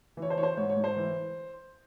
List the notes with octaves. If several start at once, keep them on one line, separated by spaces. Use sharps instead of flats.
E3
C#5
C5
E3 C#5
C5
G#2 C#5
C#5
G#2
C5
E3